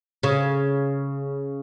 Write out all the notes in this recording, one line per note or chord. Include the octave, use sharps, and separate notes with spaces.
C#3